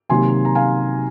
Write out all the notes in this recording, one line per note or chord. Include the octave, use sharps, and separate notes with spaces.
C3 D#3 F#3 A#3 G#5 C6
A#5
F5 G#5